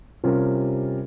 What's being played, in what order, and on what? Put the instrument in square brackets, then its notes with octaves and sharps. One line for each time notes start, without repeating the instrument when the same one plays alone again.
[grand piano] C3 G3 C#4 F4 A#4